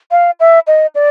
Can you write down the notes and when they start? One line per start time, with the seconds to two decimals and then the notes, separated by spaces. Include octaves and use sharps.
0.11 F5
0.40 E5
0.67 D#5
0.95 D5